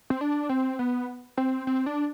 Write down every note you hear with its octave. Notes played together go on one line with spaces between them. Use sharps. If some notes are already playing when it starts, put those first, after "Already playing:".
C4
D4
C4
B3
C4
C4
D4